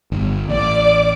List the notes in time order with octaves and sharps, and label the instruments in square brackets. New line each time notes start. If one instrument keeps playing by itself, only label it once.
[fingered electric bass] G1
[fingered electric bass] A1 [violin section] D5 D6